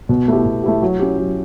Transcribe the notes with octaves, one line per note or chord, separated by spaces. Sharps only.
B2
A3 E4 G4
B2
A3 E4 G4
F#3
C#4 E4 G4
F#3